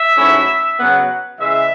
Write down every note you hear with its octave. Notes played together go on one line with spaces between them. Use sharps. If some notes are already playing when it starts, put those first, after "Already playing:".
Already playing: E5
G#2 F#3 A3 C#4 E4
C#3 F#3 B3 F#5
C#3 E3 G#3 E5